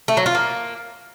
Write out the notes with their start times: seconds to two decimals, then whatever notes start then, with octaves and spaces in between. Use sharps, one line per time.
0.08 A3
0.17 F#3
0.26 F4
0.35 A#3